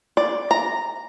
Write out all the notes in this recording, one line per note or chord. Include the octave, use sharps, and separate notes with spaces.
D5
A#5